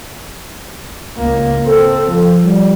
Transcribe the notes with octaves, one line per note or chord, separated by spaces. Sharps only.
C#2 A#3
C4 A4
F3
G3